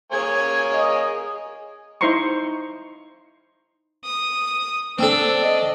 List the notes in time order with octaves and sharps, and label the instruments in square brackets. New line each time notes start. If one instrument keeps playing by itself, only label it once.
[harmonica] A#3 C#5 G#5 [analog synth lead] G#4 [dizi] G#6
[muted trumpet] D#5 [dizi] D#6
[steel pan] D#4 E4 C5 A#5 C6 C#6
[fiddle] D#6
[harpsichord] C4 A4 [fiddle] D4
[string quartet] D#5